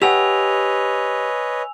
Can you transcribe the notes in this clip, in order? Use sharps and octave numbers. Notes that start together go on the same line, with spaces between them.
G4 B4 C#5 D#5 F#5 G#5 E6 F7